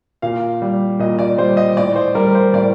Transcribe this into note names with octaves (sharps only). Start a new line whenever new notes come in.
A#2 F5
G3
A#2 D#5
D5
G3 C5
D#5
A2 D5
C5
G3 A#4
C5
A2 D5